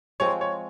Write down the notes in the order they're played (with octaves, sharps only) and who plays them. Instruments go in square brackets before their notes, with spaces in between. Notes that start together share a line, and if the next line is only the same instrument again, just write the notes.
[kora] F3 G#3 C4 [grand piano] C#5
[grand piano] C#5